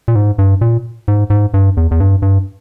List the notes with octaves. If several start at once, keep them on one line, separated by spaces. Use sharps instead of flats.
A#2
G#2
G2
A#2
G#2
G#2
G2
E2
E2
G2
G2